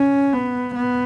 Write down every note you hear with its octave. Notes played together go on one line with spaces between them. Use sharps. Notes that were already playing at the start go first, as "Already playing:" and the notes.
Already playing: C#4
B3
B3